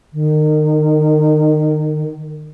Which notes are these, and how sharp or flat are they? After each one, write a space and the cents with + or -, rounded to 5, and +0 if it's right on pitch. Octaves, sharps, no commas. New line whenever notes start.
D#3 -30